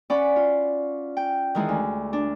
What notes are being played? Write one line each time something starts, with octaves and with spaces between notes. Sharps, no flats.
C#4 D5 F#5 B5
F4
G5
D#3 E3 G#3
D2
D4